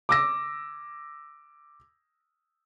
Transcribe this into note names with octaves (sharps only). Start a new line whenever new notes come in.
D6 E6 A#6